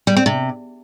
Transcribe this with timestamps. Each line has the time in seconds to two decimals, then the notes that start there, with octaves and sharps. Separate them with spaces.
0.07 G3
0.17 C4
0.26 C3